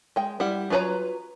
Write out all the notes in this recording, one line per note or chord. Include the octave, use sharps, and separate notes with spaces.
G#3 G5
G3 E4 F#5
F#3 F4 B4 C#5 A#5